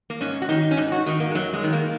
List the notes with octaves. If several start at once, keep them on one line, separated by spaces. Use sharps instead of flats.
A#3
G#2 C#4
F#4
D#3 D#4
C#4
G#2 D#4
F#4
D#3 D#4
A#3
G#3
F#2 F#3
G#3
D#3
A#3